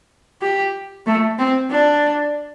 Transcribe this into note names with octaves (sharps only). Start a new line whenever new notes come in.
G4
A3
C4
D4